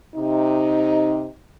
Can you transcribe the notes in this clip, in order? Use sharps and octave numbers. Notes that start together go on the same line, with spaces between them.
C3 D#4